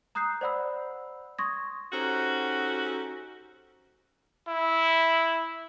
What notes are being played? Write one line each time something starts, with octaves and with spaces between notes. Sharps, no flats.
A#5 D#6 F#6 G6 C7
C5 D5 F#5 B5 E6
C6 C#6 D#6 G#6 A#6
C#4 D#4 F#4 G4 A4 C5
E4